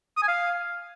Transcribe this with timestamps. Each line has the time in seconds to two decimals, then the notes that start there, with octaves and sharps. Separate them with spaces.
0.17 D#6
0.22 G#5
0.28 F5